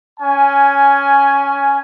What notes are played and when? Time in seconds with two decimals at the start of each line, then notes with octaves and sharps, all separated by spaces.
0.19 C#4 G#5